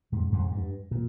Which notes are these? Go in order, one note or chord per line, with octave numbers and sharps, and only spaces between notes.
F2 G#2
F2 G#2
G2
A#2